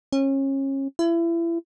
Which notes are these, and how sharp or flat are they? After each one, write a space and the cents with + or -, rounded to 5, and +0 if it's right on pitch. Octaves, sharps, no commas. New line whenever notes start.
C#4 -30
E4 +30